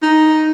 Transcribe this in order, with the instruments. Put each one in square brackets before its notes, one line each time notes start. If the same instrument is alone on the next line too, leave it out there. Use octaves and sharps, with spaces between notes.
[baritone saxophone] D#4